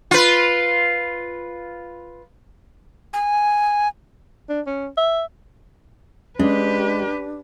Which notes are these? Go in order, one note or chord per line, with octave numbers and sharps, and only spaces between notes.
F4 B4
G#5
D4
C#4
E5
G#3 C#4 D4 G4 B4